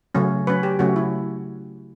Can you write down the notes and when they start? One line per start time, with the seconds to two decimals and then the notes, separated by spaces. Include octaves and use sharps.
0.15 C#3 F#3 A3 C#4
0.47 F#3 C#4 B4
0.63 G4
0.79 C#3 F#3 A3 C#4 F#4
0.96 E4